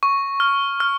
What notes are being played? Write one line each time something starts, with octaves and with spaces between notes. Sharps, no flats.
C#6
F6
F6